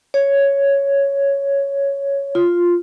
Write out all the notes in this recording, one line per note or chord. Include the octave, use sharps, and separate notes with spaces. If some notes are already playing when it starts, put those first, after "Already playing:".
C#5
F4